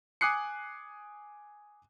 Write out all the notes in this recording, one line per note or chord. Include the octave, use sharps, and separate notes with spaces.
G#5 D6 D#6 F#6 C7 C#7